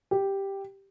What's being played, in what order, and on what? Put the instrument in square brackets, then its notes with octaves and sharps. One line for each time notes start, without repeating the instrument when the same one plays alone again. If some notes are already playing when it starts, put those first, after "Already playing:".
[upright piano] G4